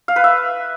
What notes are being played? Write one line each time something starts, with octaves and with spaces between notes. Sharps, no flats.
F5
B4
E5